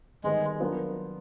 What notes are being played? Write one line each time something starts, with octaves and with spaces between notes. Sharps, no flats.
D#3 G3 G#3 B3
F#3 B3 D4 F4 A#4